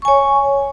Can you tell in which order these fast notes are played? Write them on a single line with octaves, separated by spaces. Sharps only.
C#6 G#5 C#5